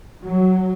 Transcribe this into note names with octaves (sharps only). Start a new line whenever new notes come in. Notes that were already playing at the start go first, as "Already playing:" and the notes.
F#3